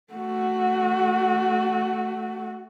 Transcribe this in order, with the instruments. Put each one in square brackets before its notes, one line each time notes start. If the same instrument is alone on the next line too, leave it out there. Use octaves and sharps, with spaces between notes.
[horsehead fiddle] A3 F#4